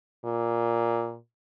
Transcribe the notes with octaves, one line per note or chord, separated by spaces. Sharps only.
A#2